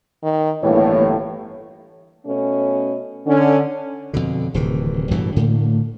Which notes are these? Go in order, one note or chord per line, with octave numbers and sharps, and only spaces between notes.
D#3
G1 A2 E3 A3 A#3 C#5
B2 A3 C#4
D3 C#4
F2 G#2 B2 D3
D1 C3 D#3 E3
A1 G2 B2 E3
A2 D3 A3 A#3